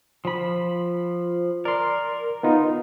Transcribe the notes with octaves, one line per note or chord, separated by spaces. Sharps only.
F3 B5
A#4 D5 C6
B3 D#4 F4